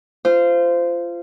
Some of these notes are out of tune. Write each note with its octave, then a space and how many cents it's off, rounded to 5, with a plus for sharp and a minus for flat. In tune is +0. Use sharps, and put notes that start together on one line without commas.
F4 -20 C5 -15